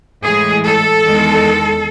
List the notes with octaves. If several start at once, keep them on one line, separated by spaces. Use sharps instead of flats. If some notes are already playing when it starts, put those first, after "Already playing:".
A2 E3 G#3 G#4
A4
E2 D#3 G#3